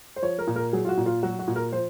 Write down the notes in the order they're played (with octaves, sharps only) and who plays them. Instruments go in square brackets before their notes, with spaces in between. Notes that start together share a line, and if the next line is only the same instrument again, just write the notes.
[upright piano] C5
F3 C#5
A#4
A#2
A#4
F#3 G#4
F4
F#4
A#2
F4
F#3 F#4
F#4
A#2
A#4
F3 C5